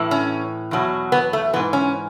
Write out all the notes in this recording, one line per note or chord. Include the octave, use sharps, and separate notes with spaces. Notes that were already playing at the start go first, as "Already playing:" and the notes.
Already playing: A2 E3
C#4
E2 B2 F#3
B3
A3
G#2 E3 B3
C#4